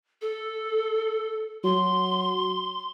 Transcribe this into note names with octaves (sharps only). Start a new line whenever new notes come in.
A4
F#3 C6